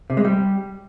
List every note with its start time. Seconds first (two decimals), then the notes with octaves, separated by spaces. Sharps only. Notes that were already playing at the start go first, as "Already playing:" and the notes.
0.10 C3
0.17 G#3
0.25 G3